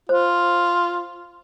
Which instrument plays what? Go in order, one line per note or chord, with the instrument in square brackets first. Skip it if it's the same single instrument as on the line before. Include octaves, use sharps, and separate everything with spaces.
[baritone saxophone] F4 [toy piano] C5